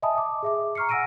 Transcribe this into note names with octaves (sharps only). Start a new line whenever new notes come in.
D#5 E5 G#5 A5 B5 D#6
D6
G#4 E5 D6
A#5 C#6 F6 C7 C#7
F#5 G#5 E6 A#6 D7 D#7